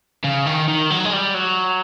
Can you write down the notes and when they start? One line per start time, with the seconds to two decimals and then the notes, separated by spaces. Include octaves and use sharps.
0.24 C#3
0.46 D#3
0.68 D#3
0.90 F#3
1.05 G#3
1.13 G3
1.34 F#3